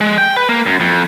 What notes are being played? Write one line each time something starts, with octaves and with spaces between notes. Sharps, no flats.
G#3
G5
B4
A#3
F#2
F2